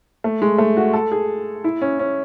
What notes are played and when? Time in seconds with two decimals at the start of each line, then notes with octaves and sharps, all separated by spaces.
0.24 A3
0.42 G#3
0.58 A3
0.77 F#4
0.93 A4
1.12 G#4
1.64 E4
1.82 C#4
1.99 C#4